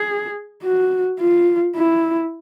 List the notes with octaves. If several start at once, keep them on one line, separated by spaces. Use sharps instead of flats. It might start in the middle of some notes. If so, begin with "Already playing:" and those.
Already playing: G#4
F#4
F4
E4